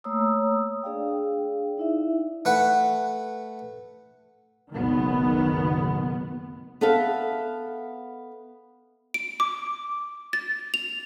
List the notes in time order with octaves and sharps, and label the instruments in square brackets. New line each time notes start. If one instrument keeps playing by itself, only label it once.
[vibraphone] A3 A#3 C#5 A#5 D#6 E6
D4 G#4 D5 F5 G5
D#4 E4 E5
[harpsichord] A3 B4 F#5
[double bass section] F#1 B1 D#3 B3
[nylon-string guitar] B3 A4 E5 F5
[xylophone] D7
D6
A6
F7